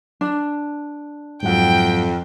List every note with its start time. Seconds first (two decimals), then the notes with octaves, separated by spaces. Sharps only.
0.21 D4
1.43 F2 G#2 F#3 F#5 G5